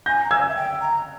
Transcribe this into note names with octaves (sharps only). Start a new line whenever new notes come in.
G#5 G6 A#6
A#5
G#5 E6 G#6
E5
G5
A#5